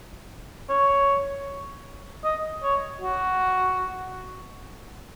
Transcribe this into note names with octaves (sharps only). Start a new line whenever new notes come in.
C#5
D#5
C#5
F#4